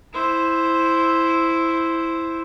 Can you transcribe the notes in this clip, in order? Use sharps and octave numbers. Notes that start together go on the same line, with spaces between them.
E4 C5